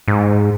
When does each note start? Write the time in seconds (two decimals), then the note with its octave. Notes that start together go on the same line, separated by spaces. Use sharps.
0.08 G#2